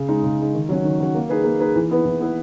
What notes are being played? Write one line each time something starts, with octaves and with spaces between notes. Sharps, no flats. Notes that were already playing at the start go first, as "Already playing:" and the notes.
Already playing: C#3
G#3 D#4
C#3
G#3 D#4
D#3
F#3 C#4 F#4
D#3
F#3 C#4 F#4
A#3
D#4 G#4 B4
A#3
D#4 G#4 B4
E3
B3 E4 B4
E3
B3 E4 B4